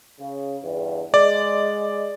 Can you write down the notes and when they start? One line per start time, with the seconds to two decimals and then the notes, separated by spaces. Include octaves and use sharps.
0.20 C#3
0.64 E2 G2
1.14 G#3 D5